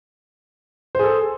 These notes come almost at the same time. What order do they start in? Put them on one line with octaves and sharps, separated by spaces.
C5 G#4 A4